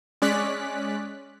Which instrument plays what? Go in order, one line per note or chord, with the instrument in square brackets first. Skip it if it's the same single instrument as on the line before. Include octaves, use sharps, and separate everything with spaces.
[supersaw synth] G#3 C#4 D5 F#6 B6